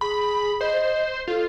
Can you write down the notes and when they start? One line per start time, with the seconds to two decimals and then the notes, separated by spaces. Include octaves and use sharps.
0.01 G#4 B5
0.61 C5 D#5
1.27 F4 A4